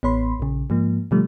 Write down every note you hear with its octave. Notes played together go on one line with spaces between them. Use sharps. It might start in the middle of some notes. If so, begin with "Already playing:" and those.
A1 B3 C#5 B5 C6
A#1 C#3
G#2 F3 A#3
B2 D3 F3 G3 A3